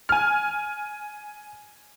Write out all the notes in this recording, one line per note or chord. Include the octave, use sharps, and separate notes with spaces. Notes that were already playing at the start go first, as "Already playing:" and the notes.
G#5 F6